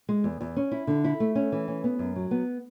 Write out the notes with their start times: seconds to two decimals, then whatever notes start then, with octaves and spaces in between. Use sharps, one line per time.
0.09 G#3
0.24 E2
0.41 E2
0.57 C#4
0.72 E4
0.87 D3
1.04 E4
1.20 A3
1.35 C#4
1.52 E3
1.68 C#4
1.84 B3
1.99 F#2
2.16 F#3
2.31 B3